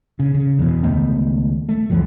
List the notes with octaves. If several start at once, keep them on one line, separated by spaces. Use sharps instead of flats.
C#3
C#3
E2 B2
C#2 D#3 A3 B3
A3
C#2 F#2 E3 F3